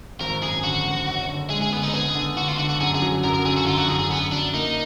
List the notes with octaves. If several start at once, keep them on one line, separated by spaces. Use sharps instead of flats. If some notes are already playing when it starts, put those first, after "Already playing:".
G#1 A#4
F#2 G#4
D3 F#4
G#1
F#1
D3
G#3 G#4
G#4
D3 B3
D#4
B3 G#4
D3
D3 F#4
F4
D3 F#4
F#4
F#2 G#4
G#4
F#3
F#2 A#4
A#4
D3 G#4
F#4
F#2 F4
F#4
F#2 G#4
G#4
F#2 B3
F#2 D4
A#3 D#4